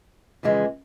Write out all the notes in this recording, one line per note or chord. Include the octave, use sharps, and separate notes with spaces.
F2 C#3 E3 G#3